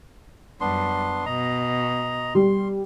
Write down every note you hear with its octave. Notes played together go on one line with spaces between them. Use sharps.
F#2 G3 B3 D4 C6
B2 D#5 A#5
G3 C6